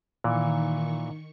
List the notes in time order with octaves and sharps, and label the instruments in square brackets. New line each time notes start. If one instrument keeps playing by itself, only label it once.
[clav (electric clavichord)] A#2 E3 [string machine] D#3 C#6